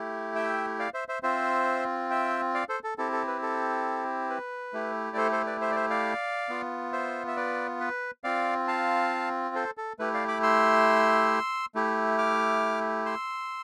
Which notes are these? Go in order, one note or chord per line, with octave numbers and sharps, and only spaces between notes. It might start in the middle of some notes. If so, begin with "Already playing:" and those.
Already playing: A3 E4 G4
E5 G5
D5 F5
C5 E5
C5 E5
C4 F4 C5 E5
E5 G5
D5 F5
A4 C5
A4
C4 E4 G4 A4
A4
B4
A4
B4
A3 E4 G4
D5
A4 C5
A4 C5
B4 D5
C5 E5
D5
C5 E5
D5 F5
B3 F4
C5 E5
E5
B4 D5
B4
C4 F4 D5 F5
F5 A5
A4 C5
A4
A3 E4 G4 B4
D5 F5
B5 D6
C6 E6
A3 E4 G4
D6 F6
C6 E6